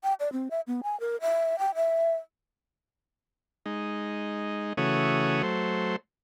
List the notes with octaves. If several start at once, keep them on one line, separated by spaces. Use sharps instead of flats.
G5
D5
C4
E5
B3
G#5
A#4
E5
G5
E5
G#3 D#4
C#3 E3 A3 F#4 C#5 D#6
F#3 A3 C5